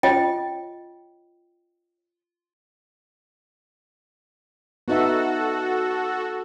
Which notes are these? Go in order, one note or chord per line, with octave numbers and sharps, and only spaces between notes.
F4 C#5 D#5 G5
B3 D#4 F#4 A4 E5